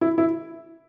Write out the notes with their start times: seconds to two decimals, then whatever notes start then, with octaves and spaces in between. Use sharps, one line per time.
0.01 E4
0.18 E4